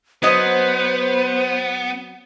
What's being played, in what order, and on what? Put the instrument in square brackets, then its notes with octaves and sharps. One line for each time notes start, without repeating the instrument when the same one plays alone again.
[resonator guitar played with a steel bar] F#3 D#5 [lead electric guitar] B3 [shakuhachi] C5